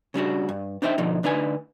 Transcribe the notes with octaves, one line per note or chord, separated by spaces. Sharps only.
C#3 G3 D4 F#4
G2
D4 D#4 C5 E5 G5
B2 D3 F3 D#4
D2 D4 D#4 B4 G#5